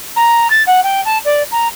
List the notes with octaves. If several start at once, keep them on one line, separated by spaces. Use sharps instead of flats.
A#5
A6
F#5
G5
A5
D5
A#5